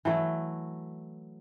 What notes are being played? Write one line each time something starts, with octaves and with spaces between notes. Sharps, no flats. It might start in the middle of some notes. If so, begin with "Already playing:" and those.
E3 F#3 A3